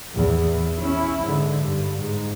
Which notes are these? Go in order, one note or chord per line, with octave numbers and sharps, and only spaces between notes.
E2 A2
E3
C#4 E4
G#2 D3
G2
G#2